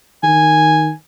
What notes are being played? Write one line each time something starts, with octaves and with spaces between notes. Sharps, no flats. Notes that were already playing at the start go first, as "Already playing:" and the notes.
D#3 G#5